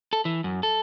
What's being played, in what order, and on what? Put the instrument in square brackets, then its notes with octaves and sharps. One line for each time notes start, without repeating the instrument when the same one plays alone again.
[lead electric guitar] A4
E3
F#2
A4